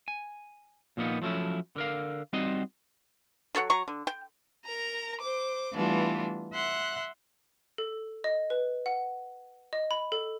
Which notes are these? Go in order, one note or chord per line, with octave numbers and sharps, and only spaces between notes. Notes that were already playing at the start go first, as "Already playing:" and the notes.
G#5
A#2 F3 A#3 B3 D#4
F3 F#3 A3 C#4 E4
D3 A#4 F5
G3 C4 D#4 F#4 C5 D#5
F#3 A4 C#5 F#5
F#3 A#5 C#6
D3
G5
A#4 A#5
C5 D6
E3 G3 A3 B3 D4 F4
E5 F#5 C6 F#6
A4
D#5
B4
F#5
D#5
B5
A4